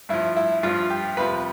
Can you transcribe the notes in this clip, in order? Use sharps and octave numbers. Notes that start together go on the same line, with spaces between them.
G2 F3 E4
E4
G2 F3 F4
G4
F2 C3 F3 B4